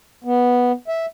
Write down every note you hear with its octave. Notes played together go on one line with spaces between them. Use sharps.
B3
E5